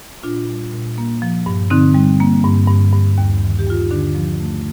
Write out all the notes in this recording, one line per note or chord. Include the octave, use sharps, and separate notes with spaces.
A#2 D4 F4
G3
A#2
A#3
F3
G2
D3 C4 D#4
G3
A#3
G2
G2
G2
D#2
D#3
G4
D#2 F4
D#4
D3 D4
F3
A3